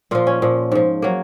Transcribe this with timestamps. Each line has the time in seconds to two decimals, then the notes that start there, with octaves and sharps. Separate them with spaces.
0.11 A#2 F3 F4
0.27 C#4
0.42 A#2 F3
0.72 G#2 F3
1.02 F#3 A#3